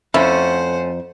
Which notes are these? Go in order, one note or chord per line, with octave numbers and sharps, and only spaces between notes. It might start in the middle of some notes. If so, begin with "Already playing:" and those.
F2 A3 C#4 E4 C5 F#5